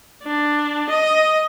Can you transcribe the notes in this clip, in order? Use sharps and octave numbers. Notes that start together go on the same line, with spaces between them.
D4
D#5